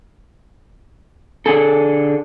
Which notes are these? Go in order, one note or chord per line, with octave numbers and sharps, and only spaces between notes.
D3 G#4 A4